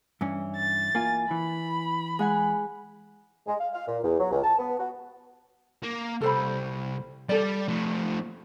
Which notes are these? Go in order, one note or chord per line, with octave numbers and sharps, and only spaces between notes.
G2 E3 C#4
A6
A#3 F4 G#5
E3 B5
G#3 F#5 G#5
G#3
F5
F5
A#2
E2
F#3
C#2
A5
B3
F#4
A#3
C2 A4 C5 B5
G3 A4 D5
F3 A3